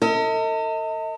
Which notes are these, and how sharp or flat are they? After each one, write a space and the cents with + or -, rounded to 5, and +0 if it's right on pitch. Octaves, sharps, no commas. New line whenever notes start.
A4 +45 D#5 +40